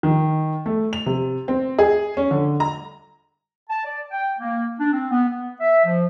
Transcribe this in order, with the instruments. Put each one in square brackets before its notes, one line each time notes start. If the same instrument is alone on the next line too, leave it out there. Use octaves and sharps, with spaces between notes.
[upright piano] D#3
A3
F7
C3
C4
G#4
C#4
D3
A#5
[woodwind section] A5
D5
G5
A#3
D4
C4
B3
B3
E5
F3